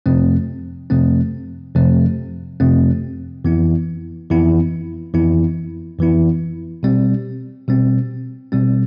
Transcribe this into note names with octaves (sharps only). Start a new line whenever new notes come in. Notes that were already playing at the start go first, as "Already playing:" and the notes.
F2 C3 F3 A3 C4
F2 C3 F3 A3 C4
F2 C3 F3 A3 C4
F2 C3 F3 A3 C4
F2 E3 B3 E4
F2 E3 B3 E4
F2 E3 B3 E4
F2 E3 B3 E4
B2 G3 C4
B2 G3 C4
B2 G3 C4